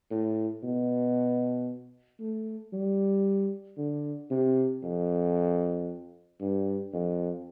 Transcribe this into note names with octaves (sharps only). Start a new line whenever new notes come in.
A2
B2
A3
G3
D3
C3
F2
G2
F2